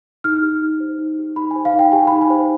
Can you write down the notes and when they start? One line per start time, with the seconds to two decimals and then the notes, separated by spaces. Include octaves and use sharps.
0.24 D#4 F6
0.42 G4
0.61 D#4
0.80 C5
0.98 D#4
1.18 G4
1.36 D#4 B5
1.51 G#5
1.56 C5
1.65 F5
1.74 D#4
1.79 G5
1.92 G4 G#5
2.07 D#4 B5
2.21 G#5
2.30 C5